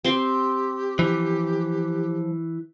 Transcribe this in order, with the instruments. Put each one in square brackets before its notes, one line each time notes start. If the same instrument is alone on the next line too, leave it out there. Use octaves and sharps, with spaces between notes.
[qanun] C4 G5 C6 [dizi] G4
[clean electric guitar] E3 [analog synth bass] F3